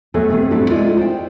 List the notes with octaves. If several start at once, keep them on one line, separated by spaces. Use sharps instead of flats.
F#3 A3 B3 G#4 A4 C5
G2 C3 A3
A2 F#3 G3 A3 C4 D4
G#3 E4 F4 A#4 D5
C5 G5